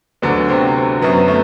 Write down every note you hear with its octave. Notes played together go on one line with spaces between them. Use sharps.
D2 D3 F#3 B3
C3 C4
F#2 F#3 B3
A3